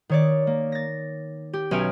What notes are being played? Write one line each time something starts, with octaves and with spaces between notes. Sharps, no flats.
D#3 C#5 D5
A#3
A6 A#6
G4
B1 C#4 E5 G#5 F6 D7